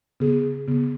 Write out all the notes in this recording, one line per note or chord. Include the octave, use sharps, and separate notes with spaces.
C#3 B3 G#4
C#3 B3 G#4